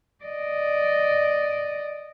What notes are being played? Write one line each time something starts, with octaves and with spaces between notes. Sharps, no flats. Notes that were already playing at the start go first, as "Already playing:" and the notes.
D5 D#5